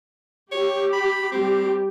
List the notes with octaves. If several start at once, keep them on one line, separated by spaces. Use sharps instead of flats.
G4 C#5
B5
G3 C4 G4